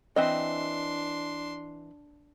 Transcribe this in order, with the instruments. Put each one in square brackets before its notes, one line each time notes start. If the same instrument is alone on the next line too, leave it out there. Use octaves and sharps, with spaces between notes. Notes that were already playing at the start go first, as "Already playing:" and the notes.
[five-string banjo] E3 C4 D#5 [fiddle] D4 C6